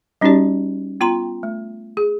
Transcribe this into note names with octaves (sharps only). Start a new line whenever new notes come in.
G3 C#4 D#4 F#4 G4 D5
B3 F4 G5 A#5 C6
A3
G#4